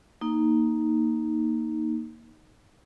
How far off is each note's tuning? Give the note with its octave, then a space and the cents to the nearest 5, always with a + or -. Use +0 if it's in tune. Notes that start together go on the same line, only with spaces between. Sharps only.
A#3 +0 D#4 +0